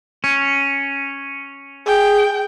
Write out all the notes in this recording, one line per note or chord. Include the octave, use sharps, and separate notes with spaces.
C#4
G#4 G5